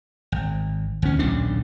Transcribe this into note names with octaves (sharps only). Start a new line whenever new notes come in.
G#1
D2 C#4
D#1 B1 C#3 D4